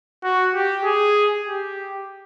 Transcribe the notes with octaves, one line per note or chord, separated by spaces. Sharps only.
F#4
G4
G#4
G4